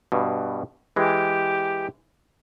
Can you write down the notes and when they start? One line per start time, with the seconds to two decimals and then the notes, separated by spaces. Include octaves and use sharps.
0.12 G2 B2
0.96 E3 G#3 G4